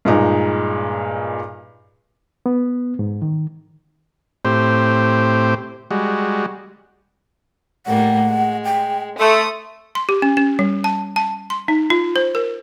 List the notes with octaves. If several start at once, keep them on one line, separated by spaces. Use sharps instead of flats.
G2 A#2 G#3 D#4
B3
G#2
D#3
A2 C4 G4 C5
G3 G#3 F#4
A2 G3 A#3 F#5
G#3
G5
A3 A4 C6 D#6
C6
G4
C#4
C#4
G3
A5
A5
C6
D#4
F4
C5
A#4